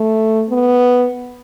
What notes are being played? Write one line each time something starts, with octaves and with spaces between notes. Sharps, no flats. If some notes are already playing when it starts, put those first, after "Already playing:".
Already playing: A3
B3